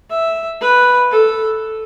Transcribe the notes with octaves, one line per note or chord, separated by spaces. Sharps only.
E5
B4
A4